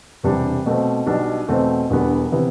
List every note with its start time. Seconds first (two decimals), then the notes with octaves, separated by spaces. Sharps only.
0.23 E1 E2 C3 G3 D4
0.66 B2 A3 C4
1.06 B1 B2 G3 D4
1.48 E2 B2 A3 C4
1.90 E1 E2 D3 G3 B3
2.32 C3 E3 B3